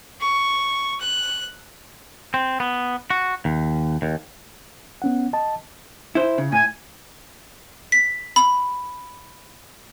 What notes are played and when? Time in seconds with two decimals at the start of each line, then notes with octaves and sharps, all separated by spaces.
0.20 C#6
1.01 F#6
2.34 C4
2.60 B3
3.10 F#4
3.45 D#2
4.02 D#2
5.02 B3 C#4 F#5
5.33 D#5 A5
6.15 E4 C5
6.38 C#3
6.52 A2 G#5
7.92 B6
8.36 B5